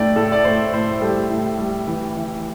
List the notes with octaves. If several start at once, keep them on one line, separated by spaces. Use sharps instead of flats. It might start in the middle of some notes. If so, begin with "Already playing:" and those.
Already playing: A2 A3 D4 D5 G5
A2 A4
D5
A2 C5
A2 C5
G3 A4
A2
G3
E3
E3